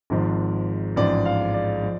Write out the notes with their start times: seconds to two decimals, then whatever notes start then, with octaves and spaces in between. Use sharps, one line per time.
0.10 G#1 G#2 F3
0.96 A1 G#2 F3 D5
1.25 F5
1.54 D5
1.83 F3